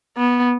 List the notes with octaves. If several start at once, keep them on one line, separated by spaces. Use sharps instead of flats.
B3